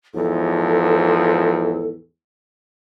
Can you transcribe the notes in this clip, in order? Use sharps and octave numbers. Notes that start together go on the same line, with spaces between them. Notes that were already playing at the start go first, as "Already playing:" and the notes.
E2 G#2 F3 A4